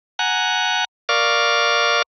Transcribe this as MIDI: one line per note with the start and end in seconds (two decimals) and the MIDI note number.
0.19 0.85 78
0.19 0.85 80
0.19 0.85 82
0.19 0.85 90
1.09 2.02 70
1.09 2.02 74
1.09 2.02 77
1.09 2.02 85
1.09 2.02 86
1.09 2.02 89